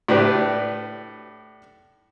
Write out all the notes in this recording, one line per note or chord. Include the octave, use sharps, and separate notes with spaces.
A2 D4 G4 B4